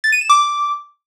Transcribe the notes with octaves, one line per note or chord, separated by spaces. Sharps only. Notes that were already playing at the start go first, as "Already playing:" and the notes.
A6
D#7
E7
D6